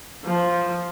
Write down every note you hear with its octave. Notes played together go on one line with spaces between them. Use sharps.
F3